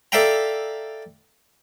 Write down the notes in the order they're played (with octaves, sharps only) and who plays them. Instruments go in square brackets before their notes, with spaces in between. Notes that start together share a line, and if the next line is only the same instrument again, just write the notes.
[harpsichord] A4 D5 E5 F5 G5 A#5